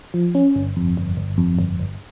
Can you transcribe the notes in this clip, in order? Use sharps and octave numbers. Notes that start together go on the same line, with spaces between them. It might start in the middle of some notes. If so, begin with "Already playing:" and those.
F3
C#4
G1
F2
G1
G1
F2
G1
G1